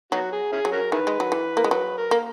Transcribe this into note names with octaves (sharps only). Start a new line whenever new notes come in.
F#3 B3 D#4 F#4
G#4
C#4 E4 G#4
F#3
C#4 F#4 A#4
D#3 E4 G#4 B4
G#3
F#3
E3
A#3
G#3
F#3 B4
A#4
A#3